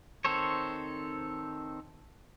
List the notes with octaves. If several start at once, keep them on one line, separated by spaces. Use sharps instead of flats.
D#3 C4 A4 C5 C#5